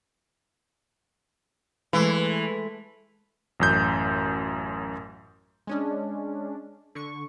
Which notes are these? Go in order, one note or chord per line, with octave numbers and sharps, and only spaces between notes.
E3 G#3 A3
A1 F#2 G6
G#3 C#4 D4
D3 C#6